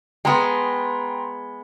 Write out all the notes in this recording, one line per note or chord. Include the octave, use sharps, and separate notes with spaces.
G#3 B3 G5 A#5 C6